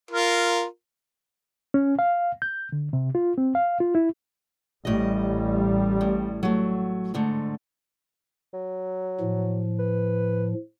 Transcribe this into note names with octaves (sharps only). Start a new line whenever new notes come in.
F4 A#4
C#4
F5
G6
D3
C3
F4
C4
F5
F4
E4
A1 A2 G3 D#5
A2
F#3 A3
G#2 D3 A3
F#3
A2 F3
B4